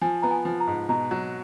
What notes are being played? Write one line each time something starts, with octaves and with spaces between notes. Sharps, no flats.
F3 G#5
B3 A#5
G#5
F3
A#5
G#2
B2 A#5
F#3